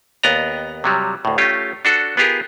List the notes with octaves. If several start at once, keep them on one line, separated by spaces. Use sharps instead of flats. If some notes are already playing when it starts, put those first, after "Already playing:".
D#2 B3 D5 D#5 A#5
C3 F#3 G3
D2 A2
A3 C#4 F4 G4
D4 F#4 A4
B3 F4 G4 G#4 A#4